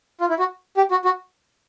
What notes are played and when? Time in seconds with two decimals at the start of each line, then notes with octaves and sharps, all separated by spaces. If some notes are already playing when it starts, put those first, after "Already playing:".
0.21 F4
0.29 E4
0.39 F#4
0.77 G4
0.91 F#4
1.05 F#4